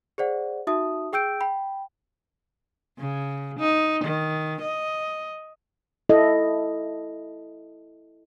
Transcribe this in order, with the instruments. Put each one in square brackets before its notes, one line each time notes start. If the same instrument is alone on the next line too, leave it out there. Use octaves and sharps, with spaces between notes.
[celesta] G#4 C5 D5 F#5
D#4 F#4 E5 A5 D#6
G#4 G5 E6 G6 D7
G5 B5
[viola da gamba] C#3
D#4
D#3
D#5
[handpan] E4 A4 D#5